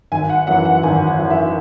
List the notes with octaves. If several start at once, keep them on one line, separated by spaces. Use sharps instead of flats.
G#1 G#5
F#5
F#2 E3 F#5
F#5
G#1 G#5
F#5
F#2 E3
E5